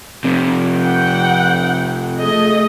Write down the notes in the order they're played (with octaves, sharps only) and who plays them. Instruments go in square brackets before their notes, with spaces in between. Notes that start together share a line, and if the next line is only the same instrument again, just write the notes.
[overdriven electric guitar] F2 C3
[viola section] F#5 G5
A3 G#4 D#5